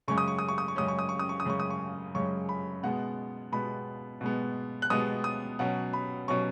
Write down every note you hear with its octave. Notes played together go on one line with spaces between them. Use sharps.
F#2 C#3 G#3 C#4 C#6
D#6
C#6
D#6
C#6
D#6
C#6
F#2 C#3 G#3 C#4 D#6
C#6
D#6
C#6
D#6
C#6
D#6
F#2 C#3 G#3 C#4 C#6
D#6
C#6
F#2 C#3 G#3 C#4 C#6
B5
B2 G#3 B3 F#5
B2 G#3 B3 B5
B2 G#3 B3
F#6
B2 G#3 B3 D#6
D#6
B2 F#3 C#4 F#5
B5
B2 F#3 C#4 C#6